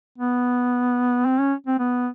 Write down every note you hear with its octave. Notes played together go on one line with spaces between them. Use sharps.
B3
C4
C#4
C4
B3